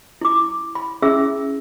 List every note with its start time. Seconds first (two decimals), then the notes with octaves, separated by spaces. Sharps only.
0.21 E4 D6
0.75 B5
1.02 C#4 E4 G#4 E5 E6